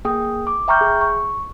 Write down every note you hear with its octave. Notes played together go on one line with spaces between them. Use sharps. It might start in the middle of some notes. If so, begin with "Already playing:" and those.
A#3 G#4 G5 D#6
D6
E5 G5 A#5 C#6 F6 G6
G#4
C#6